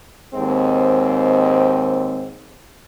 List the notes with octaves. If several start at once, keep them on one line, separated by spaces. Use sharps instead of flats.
D#2 G#2 G#3 C4